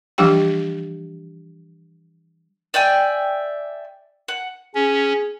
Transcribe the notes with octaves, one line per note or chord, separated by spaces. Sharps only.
E3 F3 G3 D4 G4 G5
D5 E5 G5 G#5
F#5
C#4 G#4